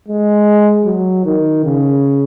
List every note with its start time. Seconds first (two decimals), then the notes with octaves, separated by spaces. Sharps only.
0.08 G#3
0.86 F#3
1.26 D#3
1.65 C#3